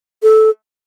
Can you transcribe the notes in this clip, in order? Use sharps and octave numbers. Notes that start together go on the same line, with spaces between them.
A4